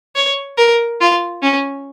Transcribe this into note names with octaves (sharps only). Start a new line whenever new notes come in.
C#5
A#4
F4
C#4